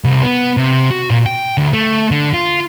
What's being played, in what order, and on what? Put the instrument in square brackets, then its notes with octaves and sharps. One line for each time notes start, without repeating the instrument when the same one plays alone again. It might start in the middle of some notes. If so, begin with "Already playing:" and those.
[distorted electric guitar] C2
B3
C3
F#4
A#2
G5
D2
A3
D3
F4